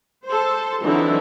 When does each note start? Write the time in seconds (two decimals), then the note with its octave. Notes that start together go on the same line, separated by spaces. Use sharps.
0.26 A4 C5
0.83 D3 E3 F#3 C4 D#4 E4